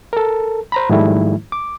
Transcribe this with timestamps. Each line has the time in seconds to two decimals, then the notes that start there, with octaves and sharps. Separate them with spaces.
0.13 A4 A#4
0.72 C5 A#5 B5
0.90 G#2 D#3 F3 G3 A3 E4
1.52 D6